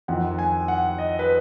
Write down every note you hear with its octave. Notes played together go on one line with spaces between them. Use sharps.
F2 D#3 F#5
G#5
F#5
D#5
B4